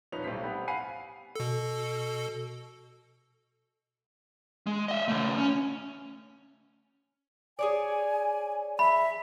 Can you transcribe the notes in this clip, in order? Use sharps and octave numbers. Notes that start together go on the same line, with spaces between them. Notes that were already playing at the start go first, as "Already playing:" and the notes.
D#1 F3 C#4 D#4 B4 F7
B1 A2 G3 C5 B6
G3 B3 C4
F5 F#5 G#5 B5 C7 D#7
B2 A4
G#3
D#5 E5
C#3 A3
C#4
G#4 C#5 D5 G#5
E5 B5